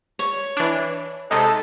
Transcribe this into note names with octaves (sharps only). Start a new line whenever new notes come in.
C#5
E3 D4
C3 G#3 D#4 A4